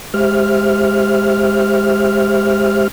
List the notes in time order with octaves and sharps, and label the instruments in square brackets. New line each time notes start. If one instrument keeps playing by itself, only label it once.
[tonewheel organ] G#3 G4 C5 E5 F6